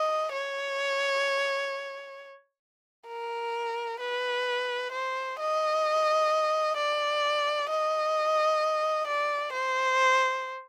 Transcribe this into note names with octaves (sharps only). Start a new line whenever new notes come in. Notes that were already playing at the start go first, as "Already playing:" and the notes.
Already playing: D#5
C#5
A#4
B4
C5
D#5
D5
D#5
D5
C5